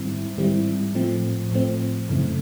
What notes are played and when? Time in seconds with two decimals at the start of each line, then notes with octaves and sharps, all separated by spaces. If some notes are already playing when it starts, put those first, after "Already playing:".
Already playing: G#2 D#3 G3 C4 E4
0.37 G#2 D#3 G3 C4 E4
0.94 A2 F3 A3 C4
1.52 A2 F3 A3 C4
2.09 F#2 C#3 E3 A3 C4